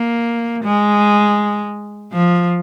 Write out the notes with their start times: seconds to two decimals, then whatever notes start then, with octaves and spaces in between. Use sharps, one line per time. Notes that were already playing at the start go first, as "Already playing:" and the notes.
Already playing: A#3
0.64 G#3
2.12 F3